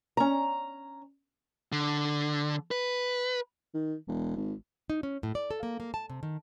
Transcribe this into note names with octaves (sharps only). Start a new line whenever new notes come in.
C#4 A#5
D3
B4
D#3
E1
G#1
D#4
C#4
A2
D5
A4
A#3
A#3
A5
C3
D#3